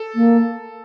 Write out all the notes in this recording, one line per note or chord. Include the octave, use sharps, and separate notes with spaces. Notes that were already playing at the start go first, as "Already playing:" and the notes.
Already playing: A4
A#3